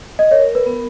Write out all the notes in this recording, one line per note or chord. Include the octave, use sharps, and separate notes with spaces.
D#5
A#4 C#5
B4
B3